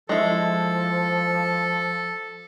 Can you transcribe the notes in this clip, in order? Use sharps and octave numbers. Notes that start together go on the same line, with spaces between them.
F3 G#3 E4 A4